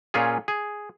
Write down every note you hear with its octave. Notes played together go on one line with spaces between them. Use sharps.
A#2 C#4 F4 G#4
G#4